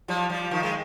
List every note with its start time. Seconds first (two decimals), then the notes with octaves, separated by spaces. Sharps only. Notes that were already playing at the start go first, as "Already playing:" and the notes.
0.08 F3 G3
0.29 F3 G3
0.51 D#3 F3
0.63 G#3